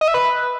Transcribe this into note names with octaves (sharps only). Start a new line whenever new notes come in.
D#5
E5
B4